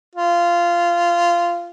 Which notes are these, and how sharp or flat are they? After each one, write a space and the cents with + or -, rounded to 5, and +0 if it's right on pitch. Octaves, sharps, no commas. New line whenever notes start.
F4 -15